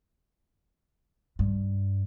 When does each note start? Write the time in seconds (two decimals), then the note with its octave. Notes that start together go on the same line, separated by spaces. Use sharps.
1.39 G2